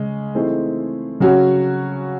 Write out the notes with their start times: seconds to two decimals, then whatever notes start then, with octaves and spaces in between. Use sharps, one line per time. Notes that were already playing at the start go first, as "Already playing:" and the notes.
Already playing: C#3 G#3 C#4
0.35 E3 A3 C4 D#4 G#4
1.20 C#3 F#3 C#4 F#4 C#5